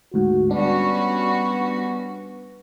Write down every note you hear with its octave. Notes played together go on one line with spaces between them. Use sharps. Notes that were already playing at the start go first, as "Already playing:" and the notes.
D2 G#2 F#4
G3 B3 C#4 D4 F#4